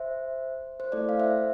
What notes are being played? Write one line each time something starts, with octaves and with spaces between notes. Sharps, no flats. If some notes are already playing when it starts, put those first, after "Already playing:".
Already playing: C5 E5
C5
A3 E4 A4 D5
F5
C5 E5